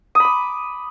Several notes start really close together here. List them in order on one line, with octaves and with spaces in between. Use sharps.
D#6 B5 D6